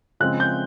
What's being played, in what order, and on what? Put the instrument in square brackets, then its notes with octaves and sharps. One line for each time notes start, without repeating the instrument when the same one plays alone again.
[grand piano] C#3 F3 G#3 C4 F#6
G6